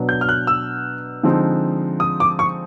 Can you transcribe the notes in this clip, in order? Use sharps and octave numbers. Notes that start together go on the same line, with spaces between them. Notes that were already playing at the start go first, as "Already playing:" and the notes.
Already playing: B2 F#3 B3 D4
G6
F6
F#6
E6
D3 F3 G#3 C4 D#4
D#6
D6
C#6